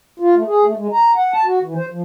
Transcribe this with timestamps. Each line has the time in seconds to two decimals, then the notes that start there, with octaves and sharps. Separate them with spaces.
0.20 F4
0.35 A3
0.48 G#4
0.64 A3
0.76 G#3
0.93 A#5
1.16 F#5
1.34 A5
1.45 F#4
1.63 E3
1.76 C5
1.90 F3